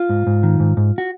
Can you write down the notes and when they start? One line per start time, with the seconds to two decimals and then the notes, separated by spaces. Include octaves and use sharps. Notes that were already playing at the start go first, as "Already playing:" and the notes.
Already playing: F4
0.09 G#2
0.27 G#2
0.43 D#3
0.60 G#2
0.77 G#2
0.98 F#4